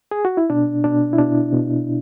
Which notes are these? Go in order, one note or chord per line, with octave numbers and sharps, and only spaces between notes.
G#4
F#4
E4
B2 D4
B2 D4
E4
B2 D4
B2